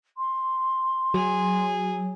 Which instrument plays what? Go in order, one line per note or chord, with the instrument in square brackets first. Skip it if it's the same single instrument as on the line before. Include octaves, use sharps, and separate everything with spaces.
[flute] C6
[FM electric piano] F#3 [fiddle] G#4